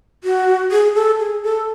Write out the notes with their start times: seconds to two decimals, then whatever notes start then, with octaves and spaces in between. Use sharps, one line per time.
0.24 F#4
0.71 G#4
0.95 A4
1.19 G#4
1.43 A4